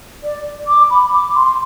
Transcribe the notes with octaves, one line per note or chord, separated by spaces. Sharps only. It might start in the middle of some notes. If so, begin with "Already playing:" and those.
D5
D6
B5
D6
C6